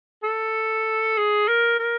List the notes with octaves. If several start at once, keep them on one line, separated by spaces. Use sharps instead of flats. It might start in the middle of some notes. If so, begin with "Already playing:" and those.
A4
G#4
A#4
A#4